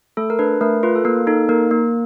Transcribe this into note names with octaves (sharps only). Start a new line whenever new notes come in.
A3 A4
A#4
D4 B4
A3 A#4
F4 B4
A4
A#3 A#4
D#4 A4
A#3 A#4
A#3